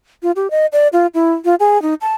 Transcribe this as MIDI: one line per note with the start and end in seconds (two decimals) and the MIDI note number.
0.23 0.31 65
0.36 0.50 67
0.51 0.66 75
0.73 0.88 74
0.93 1.07 65
1.14 1.33 64
1.45 1.55 65
1.60 1.81 68
1.82 1.94 63
2.01 2.15 81